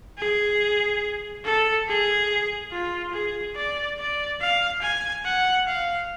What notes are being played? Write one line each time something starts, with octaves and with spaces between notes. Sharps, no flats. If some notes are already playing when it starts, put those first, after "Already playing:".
G#4
A4
G#4
F4
G#4
D5
D5
F5
G#5
F#5
F5